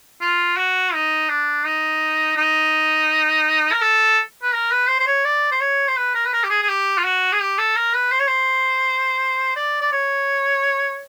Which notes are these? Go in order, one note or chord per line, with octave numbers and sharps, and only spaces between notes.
F4
F#4
D#4
D4
D#4
D#4
A#4
A4
B4
A#4
B4
C5
C5
C#5
D5
C5
C#5
C5
B4
A#4
B4
A#4
G4
G#4
G#4
G4
F4
F#4
G#4
G4
A4
A#4
B4
C5
C#5
C5
D5
D5
C#5